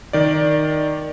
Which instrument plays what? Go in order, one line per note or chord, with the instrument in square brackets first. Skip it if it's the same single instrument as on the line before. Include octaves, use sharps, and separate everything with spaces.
[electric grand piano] D#3 D5